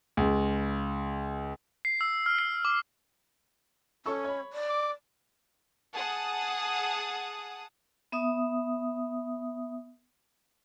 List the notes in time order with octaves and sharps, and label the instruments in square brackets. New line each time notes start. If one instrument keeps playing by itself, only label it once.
[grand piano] C#2
[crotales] C7
E6
F6
C7
D6
[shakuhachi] C#4 [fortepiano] A4 C#6 E6
[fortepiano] C#5 B5
[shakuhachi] D5
[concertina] D6
[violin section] G#4 F#5 A5 D#6
[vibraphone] B3 E5 D#6